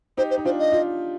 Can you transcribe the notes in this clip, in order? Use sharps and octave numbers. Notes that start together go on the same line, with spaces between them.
D#4 G4 C5
C5
D#4
D4 F4 C5
D#5
F4